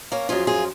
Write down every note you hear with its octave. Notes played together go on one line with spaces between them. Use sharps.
A#3 C#4
F#2 F3 F4 G#4
F4 G#4